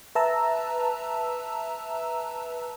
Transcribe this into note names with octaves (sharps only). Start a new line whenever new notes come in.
B4 E5 A5 A#5 E6